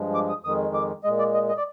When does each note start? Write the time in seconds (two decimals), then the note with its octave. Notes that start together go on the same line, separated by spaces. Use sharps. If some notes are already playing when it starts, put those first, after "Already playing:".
Already playing: G2 F3 G#3
0.14 D6
0.29 D#6
0.44 F2 D#3 G#3 D#6
0.74 D6
1.04 A#2 G#3 D#5
1.19 D5
1.34 D#5
1.49 D#5
1.57 D5